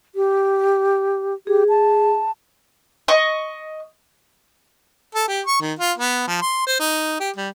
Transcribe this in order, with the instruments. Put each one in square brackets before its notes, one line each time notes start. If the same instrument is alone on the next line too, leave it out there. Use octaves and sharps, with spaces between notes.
[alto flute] G4
[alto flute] G4 [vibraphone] G#4
[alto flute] A5
[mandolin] D#5 C#6
[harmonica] A4
G4
C#6
D#3
F4
B3
F3
C6
C5
D#4
G4
G3